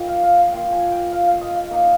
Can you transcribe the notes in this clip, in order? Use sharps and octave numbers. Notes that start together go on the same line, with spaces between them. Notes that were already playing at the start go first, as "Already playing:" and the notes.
Already playing: F3 A#3 D#4 G5
F5
F5
F5
A#3 F4 G5
G#5
G5
F5
F5
D#5
F5
A#3 D#4 F5